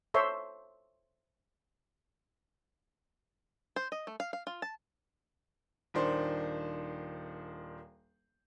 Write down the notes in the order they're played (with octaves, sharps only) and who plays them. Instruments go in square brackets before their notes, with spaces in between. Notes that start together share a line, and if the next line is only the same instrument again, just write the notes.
[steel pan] A4 C5 C#5 E5 C6
[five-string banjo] C5
D#5
A3
F5
F5
F4
A5
[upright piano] D#1 D#3 D4 C5